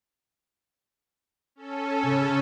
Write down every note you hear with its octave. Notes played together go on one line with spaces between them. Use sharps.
C#4 A4
C#3